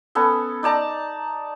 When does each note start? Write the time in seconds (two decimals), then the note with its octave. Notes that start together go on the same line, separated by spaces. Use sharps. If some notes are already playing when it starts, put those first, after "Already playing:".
0.15 B3 C#4 A4
0.63 D#4 D5 A5 A#5